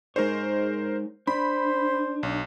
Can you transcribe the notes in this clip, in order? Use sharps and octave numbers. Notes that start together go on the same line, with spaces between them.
G#2 G#3 D#4 A#4 C5 C#5
D4 C5 B5
B1